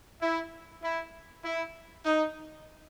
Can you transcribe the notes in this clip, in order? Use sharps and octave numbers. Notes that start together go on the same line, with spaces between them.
E4
E4
E4
D#4